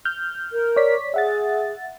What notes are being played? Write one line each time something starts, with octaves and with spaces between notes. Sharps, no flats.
F6 G6
A#4
C#5 D5 B6
G#4 E5 F#5 A6